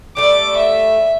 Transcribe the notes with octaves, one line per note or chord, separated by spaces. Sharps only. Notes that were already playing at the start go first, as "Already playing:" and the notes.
G3 A3 D6
E5